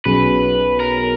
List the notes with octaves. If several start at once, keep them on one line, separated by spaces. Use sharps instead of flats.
B1 B2 F#3 C#4 G#4 B4
A#4